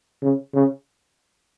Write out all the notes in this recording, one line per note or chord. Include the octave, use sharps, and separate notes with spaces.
C#3
C#3